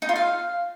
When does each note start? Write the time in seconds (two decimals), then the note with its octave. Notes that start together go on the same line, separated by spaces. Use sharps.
0.02 D#4
0.09 F4
0.16 F5